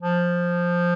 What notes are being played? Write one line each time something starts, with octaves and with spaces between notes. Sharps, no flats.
F3